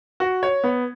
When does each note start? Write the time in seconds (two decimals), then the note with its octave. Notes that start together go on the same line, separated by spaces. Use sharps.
0.20 F#4
0.43 C#5
0.64 B3